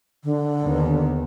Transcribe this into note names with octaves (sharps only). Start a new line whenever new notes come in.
D3
D#2 D#3 B3